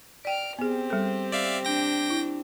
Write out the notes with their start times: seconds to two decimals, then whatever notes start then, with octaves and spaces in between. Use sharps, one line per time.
0.25 D5 G5 F6 D7
0.59 B3 C4 G4 G#4
0.90 G3 A4
1.32 D5 E5 F5
1.65 D4 G5 A#6
2.10 E4